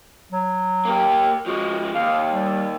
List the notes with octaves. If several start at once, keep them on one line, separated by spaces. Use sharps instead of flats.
F#3
A#3 G4
F3 G#3 F#4
D#2 F5
G3